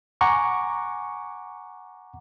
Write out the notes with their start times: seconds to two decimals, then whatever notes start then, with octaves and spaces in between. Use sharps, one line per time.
0.21 F#5 G#5 A#5 C#6 D6